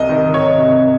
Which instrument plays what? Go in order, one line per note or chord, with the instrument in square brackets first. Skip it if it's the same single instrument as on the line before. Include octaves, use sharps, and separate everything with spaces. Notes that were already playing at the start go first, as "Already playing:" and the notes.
Already playing: [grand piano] C2 D#5
D#3
D#3 C#5
C3